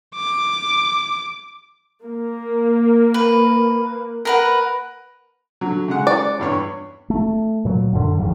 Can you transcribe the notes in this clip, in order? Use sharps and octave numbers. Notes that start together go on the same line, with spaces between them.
D6
A#3
B4
A#4 B4 F#5
D3 F#3
C#3 G#3 F#5
D5
E2 G2 C#5
A3
A#2 F#3
F#2 D3
D1 G#2 F3 G3